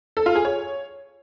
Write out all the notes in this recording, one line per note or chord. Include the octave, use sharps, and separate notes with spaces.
A4
F4
G#4
C#5